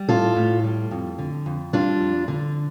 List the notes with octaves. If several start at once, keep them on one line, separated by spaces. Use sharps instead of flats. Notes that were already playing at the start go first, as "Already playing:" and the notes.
Already playing: G3
A2 F4 A4
A2
G3
F2
D3
F2
G3 D4 F4
F2
D3